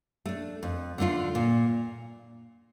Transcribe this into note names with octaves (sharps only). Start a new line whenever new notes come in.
A3 D4
F2
D3 A3 D4 F4
A#2